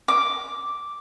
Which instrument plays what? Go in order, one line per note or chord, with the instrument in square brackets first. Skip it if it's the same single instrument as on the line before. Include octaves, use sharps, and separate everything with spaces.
[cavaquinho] D6